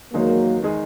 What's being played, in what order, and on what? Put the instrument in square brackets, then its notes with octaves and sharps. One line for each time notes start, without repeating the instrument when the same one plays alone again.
[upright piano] E2 D#3 G#3 D#4 G#4 [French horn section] F#3 A#3
[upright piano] D#3 G#3 D#4 G#4